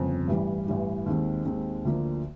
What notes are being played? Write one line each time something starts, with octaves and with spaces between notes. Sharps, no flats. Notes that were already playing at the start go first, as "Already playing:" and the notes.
Already playing: G1 F2 C#3
A1 G2 E3 G3
A1 G2 E3 G3
D#2 D#3 G#3 C4
D#2 D#3 G#3 C4
D2 D3 F3 A#3